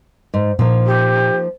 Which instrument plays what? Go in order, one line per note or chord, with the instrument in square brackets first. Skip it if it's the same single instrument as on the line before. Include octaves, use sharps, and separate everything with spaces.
[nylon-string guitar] G#2
[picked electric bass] A#2 [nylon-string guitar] F3 A#3 D#4
[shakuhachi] G4